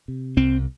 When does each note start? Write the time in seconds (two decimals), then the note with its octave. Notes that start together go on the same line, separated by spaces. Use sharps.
0.08 C3
0.37 C2 C4